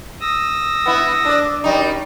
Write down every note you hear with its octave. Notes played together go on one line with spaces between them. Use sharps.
D#6 E6 A#6
B3 E4
D4 D5
F#2 G3 D#4